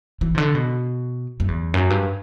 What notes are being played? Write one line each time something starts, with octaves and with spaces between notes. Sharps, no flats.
E3
C3
D3
B2
F#2
E2
F#2
G2